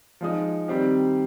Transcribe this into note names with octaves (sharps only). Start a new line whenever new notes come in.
F3 G#3 D#4
D#3 G3 C4 G4